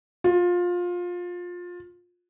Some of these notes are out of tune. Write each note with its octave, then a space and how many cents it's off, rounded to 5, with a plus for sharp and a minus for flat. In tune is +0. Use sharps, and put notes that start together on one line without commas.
F4 +20